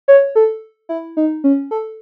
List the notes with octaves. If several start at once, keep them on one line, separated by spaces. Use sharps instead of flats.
C#5
A4
E4
D#4
C#4
A4